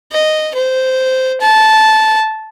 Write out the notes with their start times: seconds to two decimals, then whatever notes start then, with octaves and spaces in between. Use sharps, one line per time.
0.12 D#5
0.54 C5
1.41 A5